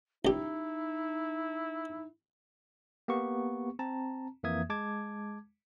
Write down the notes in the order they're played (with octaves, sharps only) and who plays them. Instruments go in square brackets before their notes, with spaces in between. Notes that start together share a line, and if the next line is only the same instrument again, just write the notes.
[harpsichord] C#2 G4 [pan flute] D#4 [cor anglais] E4
[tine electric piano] A#3 B3 G4 C#6
C4 A5 A#5
F2 E3 A#3 E5 D#6 G#6
G#3 A5 D6 G#6